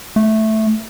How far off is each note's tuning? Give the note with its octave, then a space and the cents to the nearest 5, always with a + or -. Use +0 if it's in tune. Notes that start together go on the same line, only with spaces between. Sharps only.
A3 -5